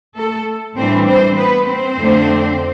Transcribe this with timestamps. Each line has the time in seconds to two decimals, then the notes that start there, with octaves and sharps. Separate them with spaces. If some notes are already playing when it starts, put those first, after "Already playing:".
0.15 A3 A4
0.76 A2 E3 G3 C4 D4 C5
1.06 C4 C5
1.36 B3 B4
1.66 C4 C5
1.97 F2 D3 A3 D4